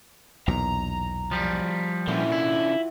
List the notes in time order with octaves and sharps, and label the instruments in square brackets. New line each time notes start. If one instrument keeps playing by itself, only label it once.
[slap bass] B1 E2 A#2 [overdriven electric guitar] A#5
[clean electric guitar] F3 G3
[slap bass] A#2 [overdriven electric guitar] D3 C#4 [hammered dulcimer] E3 F#3 F4
[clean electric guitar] E4